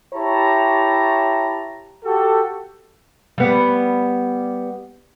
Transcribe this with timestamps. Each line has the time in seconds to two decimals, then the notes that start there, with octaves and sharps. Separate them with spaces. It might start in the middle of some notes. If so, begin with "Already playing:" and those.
0.14 E4 G4 C#5 A5 A#5
2.04 F#4 G4 A4
3.38 G3 B3